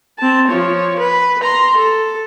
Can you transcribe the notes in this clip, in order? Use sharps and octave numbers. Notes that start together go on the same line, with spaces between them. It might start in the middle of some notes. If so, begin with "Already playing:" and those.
C4 A5
F3 C#5
B4
A#5 C6
A4